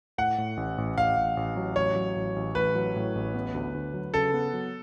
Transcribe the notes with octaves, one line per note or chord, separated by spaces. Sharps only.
A2 F#5
A2
A1
A1
A1 F5
A1
A1
F#3
A1 C#5
F#3
A1
A1
A1 B4
F#3
A2
A1
B3
D2
D2
F#3
C#3 A4
B3
F#3